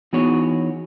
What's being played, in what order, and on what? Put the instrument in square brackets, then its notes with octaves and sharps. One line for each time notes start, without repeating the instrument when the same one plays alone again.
[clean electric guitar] E3 B3 D#4 F#4 G#4 C#5